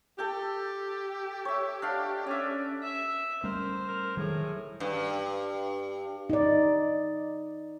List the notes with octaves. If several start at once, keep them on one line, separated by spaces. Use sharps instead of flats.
G4 A4 G5
C#5 E5
D4 F5 F#5
C#4 D5 E5
E5
G3 A3 C#4 A#4 C5
A#4
A2 D#3 F#3 G3 G#4
G2
D#4 D5